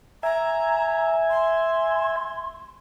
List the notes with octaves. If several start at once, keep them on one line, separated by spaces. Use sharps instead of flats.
E5 G#5 A#5
C6